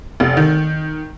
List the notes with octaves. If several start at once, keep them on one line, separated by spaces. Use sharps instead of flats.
F1
D#3